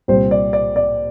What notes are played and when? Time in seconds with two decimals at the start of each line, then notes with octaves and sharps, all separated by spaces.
0.08 C2 A#2 G3 C4 C5
0.31 D5
0.53 D5
0.76 D5